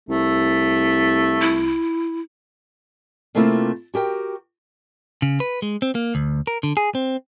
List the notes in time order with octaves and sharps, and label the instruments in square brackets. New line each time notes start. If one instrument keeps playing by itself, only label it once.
[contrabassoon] C2 [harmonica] A3
[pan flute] E4
[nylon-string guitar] C3 A3 A#3 C4 E4 F4
F#4 G4 A#4 G5
[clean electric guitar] C#3
B4
G#3
C4
A#3
D2
A#4
D3
G#4
C4